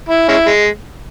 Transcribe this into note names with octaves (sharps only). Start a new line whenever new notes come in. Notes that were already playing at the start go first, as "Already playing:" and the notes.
E4
G#3 C#4 E4
G#3